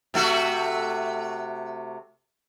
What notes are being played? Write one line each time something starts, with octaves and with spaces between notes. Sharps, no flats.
C3 A3 F#4